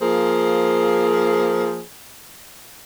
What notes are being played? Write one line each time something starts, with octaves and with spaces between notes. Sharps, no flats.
F3 A#3 G#4 C5